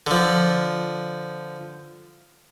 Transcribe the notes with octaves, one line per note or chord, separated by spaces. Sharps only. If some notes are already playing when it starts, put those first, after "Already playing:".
D3 F3